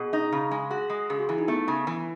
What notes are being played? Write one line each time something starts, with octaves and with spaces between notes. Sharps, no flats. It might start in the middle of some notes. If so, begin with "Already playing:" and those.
Already playing: B2 G#4
D#4
C#3
G#3
F#4 G#4
G#3
C#3 G#4
F#4
E3 E4
D#4
A3 B3
C#3
E3